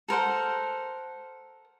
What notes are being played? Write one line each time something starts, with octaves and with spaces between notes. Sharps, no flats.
A4 A#4 C5 F#5